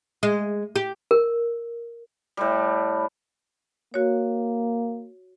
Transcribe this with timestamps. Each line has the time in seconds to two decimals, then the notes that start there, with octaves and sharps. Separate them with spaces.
0.23 G#3
0.76 G4
1.11 A#4
2.37 A2 G3
3.94 A#3 F#4 C#5